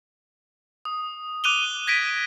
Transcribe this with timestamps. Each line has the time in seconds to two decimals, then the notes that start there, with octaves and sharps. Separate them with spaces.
0.85 D#6
1.44 D6 F#6 D#7 F7 G7
1.87 G#6 A#6 B6 D7 D#7